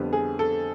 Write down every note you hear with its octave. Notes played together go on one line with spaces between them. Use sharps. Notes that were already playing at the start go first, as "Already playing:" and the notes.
Already playing: F2 D3 G3 B3
G#4
A4